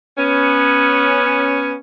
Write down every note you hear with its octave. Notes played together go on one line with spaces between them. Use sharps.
B3 C#4